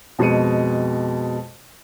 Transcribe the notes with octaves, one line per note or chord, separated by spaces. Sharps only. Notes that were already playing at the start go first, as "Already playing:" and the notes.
F2 B2 G#3 C#7 D#7